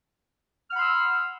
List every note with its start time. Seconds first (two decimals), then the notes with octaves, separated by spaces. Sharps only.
0.69 F6
0.72 F#5
0.75 B5
0.79 C6
0.82 E6